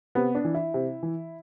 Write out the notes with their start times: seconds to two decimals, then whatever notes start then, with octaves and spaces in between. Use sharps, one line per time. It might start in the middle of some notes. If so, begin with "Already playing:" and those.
0.15 C3 B3
0.35 D4
0.45 E3
0.54 E4
0.74 C3
1.03 E3